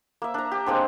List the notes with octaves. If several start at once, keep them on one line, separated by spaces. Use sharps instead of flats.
A#3 E5
D4 A#5
G4
G#3 A#3 C4 D4